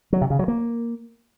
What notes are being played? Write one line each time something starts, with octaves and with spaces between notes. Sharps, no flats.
F#3
C3
C#3
F#3
A#3